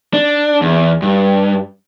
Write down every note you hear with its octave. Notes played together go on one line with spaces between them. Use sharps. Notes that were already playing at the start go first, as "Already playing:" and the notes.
D4
E2
G2